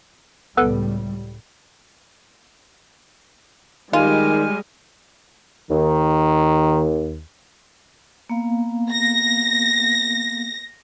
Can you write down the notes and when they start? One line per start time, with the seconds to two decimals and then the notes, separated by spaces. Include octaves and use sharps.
0.57 C#2 A2 G3 B3 A4 B4
3.93 D#3 G3 G#3 F4 G#5 F6
5.71 D#2 D#3
8.29 A#3 B3 F5
8.91 A#6